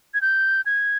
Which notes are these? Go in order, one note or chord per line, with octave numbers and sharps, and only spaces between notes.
G#6
G6
G#6